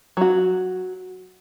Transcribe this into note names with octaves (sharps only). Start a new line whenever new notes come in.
F#3 F#4